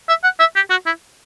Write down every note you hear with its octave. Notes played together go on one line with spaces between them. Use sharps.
E5
F#5
E5
G4
F#4
E4